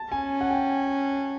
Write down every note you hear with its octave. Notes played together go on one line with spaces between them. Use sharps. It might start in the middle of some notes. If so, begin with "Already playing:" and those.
Already playing: A5
C#4 G#5
F#5
G5